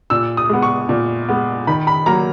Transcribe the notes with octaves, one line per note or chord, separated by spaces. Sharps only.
A#2 E6
D#6
G#3 B3
C#6
A#2
G#3 B3
D#3 B5
B5
F#3 A#3 A#5